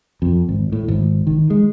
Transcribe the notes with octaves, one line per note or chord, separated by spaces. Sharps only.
F2
G#1
A2
G#1
D#3
G#3